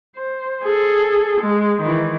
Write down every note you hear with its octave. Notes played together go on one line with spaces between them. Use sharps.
C5
G#4 A4
G#3
D#3 E3